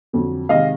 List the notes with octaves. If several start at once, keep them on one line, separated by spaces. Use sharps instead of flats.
F2 D3 F#3
C3 D#3 G#3 D#5 F5